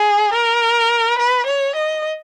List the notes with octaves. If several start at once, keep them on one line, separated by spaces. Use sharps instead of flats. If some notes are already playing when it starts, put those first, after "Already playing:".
Already playing: G#4
A#4
B4
C#5
D#5